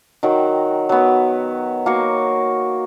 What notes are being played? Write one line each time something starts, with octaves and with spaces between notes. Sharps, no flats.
D#3 F#3 G5
F#3 B3
A#3 F#4 C#5